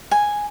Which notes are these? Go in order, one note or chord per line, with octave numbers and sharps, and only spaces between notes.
G#5